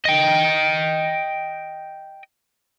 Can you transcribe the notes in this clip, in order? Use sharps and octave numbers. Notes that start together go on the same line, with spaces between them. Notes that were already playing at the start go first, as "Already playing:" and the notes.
D#5 G5